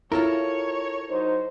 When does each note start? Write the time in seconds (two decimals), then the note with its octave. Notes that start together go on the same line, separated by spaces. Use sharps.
0.12 E4 F4 A4 A#4 C#5
1.10 F#3 D#4 C5